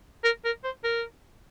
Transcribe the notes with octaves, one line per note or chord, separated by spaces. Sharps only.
A#4
A#4
C5
A#4